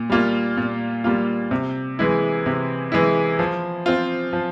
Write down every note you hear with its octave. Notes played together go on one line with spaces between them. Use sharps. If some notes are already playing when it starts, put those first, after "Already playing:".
Already playing: A#2
G3 A#3 F4
A#2
G3 A#3 F4
C3
E3 G#3 E4
C3
E3 G#3 E4
F3
C4 F4
F3